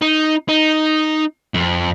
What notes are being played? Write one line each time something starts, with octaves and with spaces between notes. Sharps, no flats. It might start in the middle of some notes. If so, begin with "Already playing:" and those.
D#4
D#4
F2